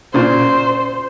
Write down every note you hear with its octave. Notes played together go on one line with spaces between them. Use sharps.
A#2 C#3 C5